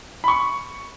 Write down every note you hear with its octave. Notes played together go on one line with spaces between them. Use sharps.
B5
C#6